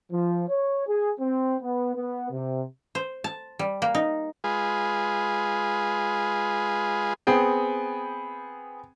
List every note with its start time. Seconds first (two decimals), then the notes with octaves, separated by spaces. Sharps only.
0.11 F3
0.49 C#5
0.87 G#4
1.20 C4
1.61 B3
1.95 B3
2.31 C3
2.95 C5
3.24 A5
3.59 G3
3.82 A#3
3.95 D#4
4.44 G#3 F4 G#4 B4
7.27 B3 C4 G#4 G5